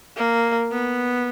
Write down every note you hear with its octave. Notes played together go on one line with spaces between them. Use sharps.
A#3
B3